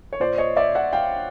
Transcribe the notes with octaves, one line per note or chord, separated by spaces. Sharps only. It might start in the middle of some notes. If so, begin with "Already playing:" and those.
C#5
A#2 C5 D5
C#5 D#5
D5 E5
E5 F#5
F5 G5